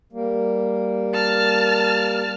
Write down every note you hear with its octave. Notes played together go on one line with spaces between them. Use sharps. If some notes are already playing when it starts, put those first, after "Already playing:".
G3 A#3
A5 F6